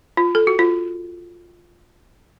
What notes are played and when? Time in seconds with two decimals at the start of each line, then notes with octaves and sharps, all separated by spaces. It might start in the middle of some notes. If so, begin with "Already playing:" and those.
0.17 F4
0.35 A4
0.47 F#4
0.59 F4